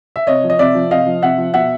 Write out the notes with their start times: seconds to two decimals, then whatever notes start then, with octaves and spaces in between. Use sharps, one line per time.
0.16 E5
0.27 C3 C#5 D#5
0.43 F3
0.50 D#5
0.59 C3 D5 E5
0.75 F3
0.91 C3 D#5 F5
1.06 F3
1.22 C3 E5 F#5
1.38 F3
1.54 B2 E5 F#5